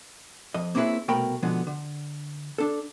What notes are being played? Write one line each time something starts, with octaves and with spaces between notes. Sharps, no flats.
F2 D#5
A#3 C4 C#4 E4 G#4 B4
C2 B2 A3 A#4 G5 B5
B2 D3 F3 G#3 B3
D3
D4 A4